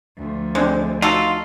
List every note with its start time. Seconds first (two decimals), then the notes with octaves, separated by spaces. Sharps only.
0.17 D2 F3
0.55 G#3 C4 D4 C5
1.02 D#4 F4 F#4 A4